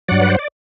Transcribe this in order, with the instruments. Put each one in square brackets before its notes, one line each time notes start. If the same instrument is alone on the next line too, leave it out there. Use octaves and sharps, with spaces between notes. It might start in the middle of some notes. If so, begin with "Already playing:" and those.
[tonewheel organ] G2 F#3 D5 F#5
B4
C5
D5